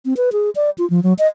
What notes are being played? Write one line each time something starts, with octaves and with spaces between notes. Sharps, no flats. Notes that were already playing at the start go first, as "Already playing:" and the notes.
C4
B4
G#4
D5
F4
F3
F#3
D#5